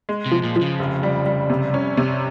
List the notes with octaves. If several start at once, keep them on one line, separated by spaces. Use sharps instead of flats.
G#3
C3
F3
A#2
F3
C#3
F1
G3
G3
C3
C#4
C3